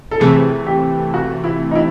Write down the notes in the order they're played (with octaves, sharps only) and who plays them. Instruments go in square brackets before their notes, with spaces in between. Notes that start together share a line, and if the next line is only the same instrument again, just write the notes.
[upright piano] A4
[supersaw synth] C3 E3 A3 [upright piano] G#4
[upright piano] G4
F#4
E4
D#4
E4